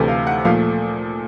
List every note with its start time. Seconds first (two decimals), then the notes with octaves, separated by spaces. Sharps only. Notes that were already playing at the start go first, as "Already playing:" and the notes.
Already playing: D2 C3 E3 A3
0.08 F5
0.27 F#5
0.45 A#2 F3 A3 F5